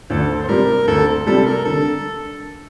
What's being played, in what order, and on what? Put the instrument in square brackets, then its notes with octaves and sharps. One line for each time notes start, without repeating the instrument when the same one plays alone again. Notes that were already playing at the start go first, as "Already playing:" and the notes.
[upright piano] D2 [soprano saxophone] A4
[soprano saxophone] C5
[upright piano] C3 G3 [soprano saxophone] A#4
[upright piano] D2 [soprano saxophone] A4
[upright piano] C3 G3 [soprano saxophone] A4
[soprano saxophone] A#4
[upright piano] D3 [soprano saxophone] A4